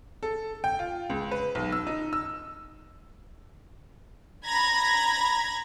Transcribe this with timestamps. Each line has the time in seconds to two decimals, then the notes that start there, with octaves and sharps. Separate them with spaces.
0.23 A4
0.64 G5
0.79 F4
1.10 C#2
1.31 B4
1.55 B1
1.72 E6
1.87 D#4
2.13 E6
4.45 A#5 B5 G#6 A#6